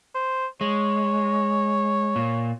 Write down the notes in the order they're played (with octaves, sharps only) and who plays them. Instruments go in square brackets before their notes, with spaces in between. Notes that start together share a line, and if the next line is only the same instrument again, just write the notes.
[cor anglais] C5
[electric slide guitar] G#3 [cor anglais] C#5
[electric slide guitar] A#2